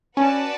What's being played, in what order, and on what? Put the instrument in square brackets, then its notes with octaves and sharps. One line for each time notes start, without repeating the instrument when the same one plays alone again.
[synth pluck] C#4 [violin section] F#4 B4 D5 A5